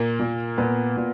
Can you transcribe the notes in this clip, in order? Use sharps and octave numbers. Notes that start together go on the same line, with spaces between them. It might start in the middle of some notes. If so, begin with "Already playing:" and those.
Already playing: A#2 A#3
A#2
A#2 B3
A#2